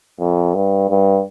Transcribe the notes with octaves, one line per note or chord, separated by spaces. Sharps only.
F2
G2
G2